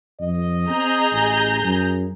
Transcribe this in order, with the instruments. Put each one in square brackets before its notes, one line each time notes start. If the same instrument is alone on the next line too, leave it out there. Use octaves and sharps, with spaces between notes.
[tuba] F2 [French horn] D#5
[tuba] C4 [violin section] G#4 A#5 G6
[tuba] A1
F#2